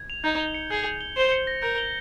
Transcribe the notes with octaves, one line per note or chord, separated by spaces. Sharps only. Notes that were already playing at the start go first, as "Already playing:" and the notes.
Already playing: G#6
F7
D#4 G6
G7
C#7
G#4 G6
G6
G7
C5 G7
C#7
A#6
A#4 G6
G7